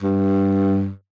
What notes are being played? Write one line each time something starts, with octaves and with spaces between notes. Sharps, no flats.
G2